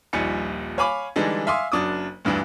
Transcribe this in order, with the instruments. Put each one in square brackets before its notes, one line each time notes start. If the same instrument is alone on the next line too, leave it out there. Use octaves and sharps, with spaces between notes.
[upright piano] D#1 A#1 G3 D#4 G#5 C#7
C#5 F5 G#5 B5 D6
D3 E3 G3 G#3 D4 D#4
E5 F5 G#5 C6 D6 D#6
F#1 F#2 F#3 D4 D6 D#6
D2 G2 E3 D4